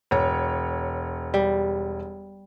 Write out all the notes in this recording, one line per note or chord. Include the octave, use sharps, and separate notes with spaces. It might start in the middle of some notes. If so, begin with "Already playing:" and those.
E1 C#5
G3